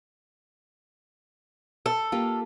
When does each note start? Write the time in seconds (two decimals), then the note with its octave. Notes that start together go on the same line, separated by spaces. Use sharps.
1.86 A4
2.12 A#3 F4 G4